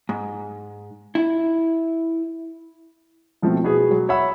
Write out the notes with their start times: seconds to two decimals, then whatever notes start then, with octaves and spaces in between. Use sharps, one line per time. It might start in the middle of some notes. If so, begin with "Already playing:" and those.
0.09 G#2
1.15 E4
3.42 B2 F3 A3 C4
3.64 B2 B3 F#4 G#4
3.91 F#3
4.09 C#5 E5 F#5 B5 E6